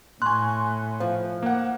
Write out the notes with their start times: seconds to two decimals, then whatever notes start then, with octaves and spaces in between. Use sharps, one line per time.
0.22 A2 G#5 C6 C#6 F#6
1.00 F3
1.43 A#3 F#5